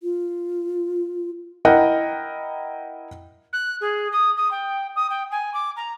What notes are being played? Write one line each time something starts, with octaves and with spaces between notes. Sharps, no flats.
F4
E4 A#4 D#5 F#5 G5
F#6
G#4
D#6
D#6
G5
D#6
G5
G#5
D6
A#5